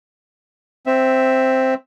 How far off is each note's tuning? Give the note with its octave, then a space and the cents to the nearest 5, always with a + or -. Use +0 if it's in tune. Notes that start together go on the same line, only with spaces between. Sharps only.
C4 +0 E5 +0